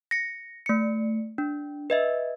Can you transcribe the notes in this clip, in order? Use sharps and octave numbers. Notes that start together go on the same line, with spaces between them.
A#6 C#7
A3 C#7
D4
B4 D#5 E5